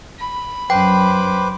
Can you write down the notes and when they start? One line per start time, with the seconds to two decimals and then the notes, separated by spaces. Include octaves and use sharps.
0.19 B5
0.70 F#2 B4 C5 G5 D6